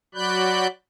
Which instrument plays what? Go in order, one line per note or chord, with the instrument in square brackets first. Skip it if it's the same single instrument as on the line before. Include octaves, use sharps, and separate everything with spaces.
[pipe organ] F#3 F#4 D5 B5 F#6 G6